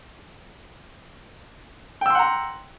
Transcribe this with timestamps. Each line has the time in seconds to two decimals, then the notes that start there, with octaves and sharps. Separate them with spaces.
2.01 G5
2.06 E6
2.10 C6
2.15 F#5
2.19 A#5